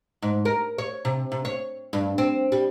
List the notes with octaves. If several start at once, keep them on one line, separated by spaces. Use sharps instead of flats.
G#2
A#4
C#5
C3
C3
C#5
G2
C4
G3